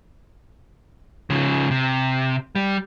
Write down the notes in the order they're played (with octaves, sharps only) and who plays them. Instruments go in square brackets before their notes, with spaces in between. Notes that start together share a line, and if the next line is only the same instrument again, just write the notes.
[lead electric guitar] C#3 F3
C3
G3